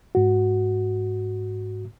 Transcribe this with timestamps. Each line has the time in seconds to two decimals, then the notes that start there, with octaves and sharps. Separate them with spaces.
0.15 G#2 F#4